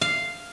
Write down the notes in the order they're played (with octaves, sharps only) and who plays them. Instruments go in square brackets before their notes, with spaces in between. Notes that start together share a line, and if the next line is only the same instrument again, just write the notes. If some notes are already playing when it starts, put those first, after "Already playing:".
[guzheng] F5